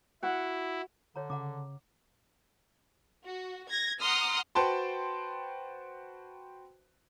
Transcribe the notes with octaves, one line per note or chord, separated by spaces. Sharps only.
E4 F#4 F#5
D3 C#5 A#5
C#3 F#5 A#5 D6
F#4
G#6 A#6
F#5 A#5 C6 D#6 F6
F#4 B4 C5 G5 A5 C6